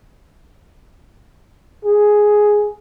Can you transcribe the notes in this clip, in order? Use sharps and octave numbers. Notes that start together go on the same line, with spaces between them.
G#4